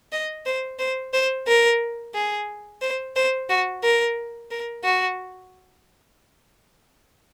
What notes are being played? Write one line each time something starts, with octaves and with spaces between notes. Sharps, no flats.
D#5
C5
C5
C5
A#4
G#4
C5
C5
F#4
A#4
A#4
F#4